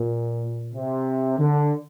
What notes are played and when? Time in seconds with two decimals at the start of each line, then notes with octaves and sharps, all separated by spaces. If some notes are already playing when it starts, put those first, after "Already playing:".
Already playing: A#2
0.73 C3
1.39 D3